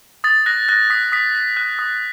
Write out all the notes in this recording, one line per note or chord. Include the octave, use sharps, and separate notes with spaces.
D#6 A6
F#6 A#6
F#6 A#6
D#6 B6
D#6 B6
F#6
F#6
D#6